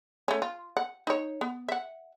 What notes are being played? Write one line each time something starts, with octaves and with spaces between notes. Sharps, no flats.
A3 C#4
F4
F#5
D#4 C#5
B3
E5 F#5